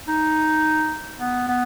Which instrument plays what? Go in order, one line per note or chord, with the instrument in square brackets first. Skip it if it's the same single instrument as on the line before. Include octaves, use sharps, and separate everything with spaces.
[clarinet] D#4
B3
B3